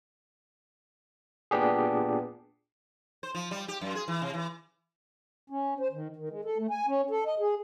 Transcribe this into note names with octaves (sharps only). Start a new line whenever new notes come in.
A#2 B3 D4 G4 G#4
C5
F3
G3
G4
F#2
G#4
E3
C3
E3
C#4
C5
D#3
D#3
G#3
A4
A3
G#5
C#4
A4
D#5
G#4